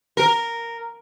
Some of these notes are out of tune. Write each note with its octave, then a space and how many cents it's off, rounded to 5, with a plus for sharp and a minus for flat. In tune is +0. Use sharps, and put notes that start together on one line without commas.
A#4 -5